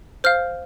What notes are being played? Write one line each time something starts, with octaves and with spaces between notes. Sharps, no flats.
C5 F5 F6